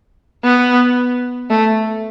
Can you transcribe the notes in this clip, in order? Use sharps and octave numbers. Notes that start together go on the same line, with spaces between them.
B3
A3